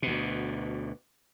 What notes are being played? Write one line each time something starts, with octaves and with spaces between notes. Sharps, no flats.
D2 B2